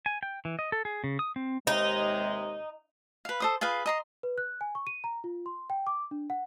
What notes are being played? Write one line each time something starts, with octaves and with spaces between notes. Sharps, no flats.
G#5
G5
E3
D#5
A4
G#4
C#3
D#6
C4
D#2 C3 G#3 D#4
B4 F5
A4 C5 D#6
F4 G#4 B4 F5
D#5 A#5 C6
B4
F#6
G#5
C#6
D#7
A#5
F4
C6
G5
D6
D4
F#5